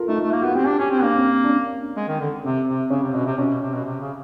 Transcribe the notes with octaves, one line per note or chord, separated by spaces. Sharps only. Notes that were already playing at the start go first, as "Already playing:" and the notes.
Already playing: F4 A4 A#4
A3 D#4
A3
A#3
B3 F#4
C4 G4
D4
C#4 G4
C4
A#3 D4
C4
C#4
D4
C#4
G#3
D#3
D3
C3 C4
C3
C#3 C#4
C3
B2 C#4
C3
B2 C#4
B2
C3
B2
C3
C#3